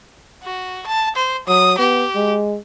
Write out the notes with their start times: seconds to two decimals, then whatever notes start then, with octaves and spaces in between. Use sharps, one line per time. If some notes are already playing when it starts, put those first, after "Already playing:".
0.43 F#4
0.87 A5
1.16 C5
1.48 F#3 D#6
1.78 B3 G4
2.15 G#3